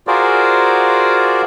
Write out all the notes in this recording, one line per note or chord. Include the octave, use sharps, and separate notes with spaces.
F4 F#4 G#4 A#4 C5 D5